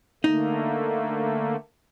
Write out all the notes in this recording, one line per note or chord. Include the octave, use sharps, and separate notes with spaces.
D3 A3 A#3 D#4